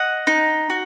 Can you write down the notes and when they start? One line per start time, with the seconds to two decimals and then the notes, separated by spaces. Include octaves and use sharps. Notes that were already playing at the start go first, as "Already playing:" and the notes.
Already playing: D#5 F#5
0.27 D#4
0.70 F#4